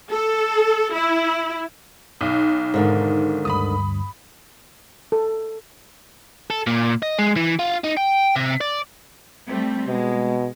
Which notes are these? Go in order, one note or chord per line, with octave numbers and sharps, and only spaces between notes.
A4
E4
B1 D#4
G#2 D3 D#3
D2 G2 B5 D#6
A4
A4
A#2
D#5
G#3
E3
F4
D#4
G5
C3
D5
G3 A3 C4
B2 G#3